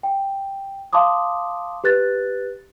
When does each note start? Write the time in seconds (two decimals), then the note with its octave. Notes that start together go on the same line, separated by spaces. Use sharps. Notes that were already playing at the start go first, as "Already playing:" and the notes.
0.03 G5
0.93 F5 A5 C6 D6 D#6
1.84 G4 B4 F#6 A6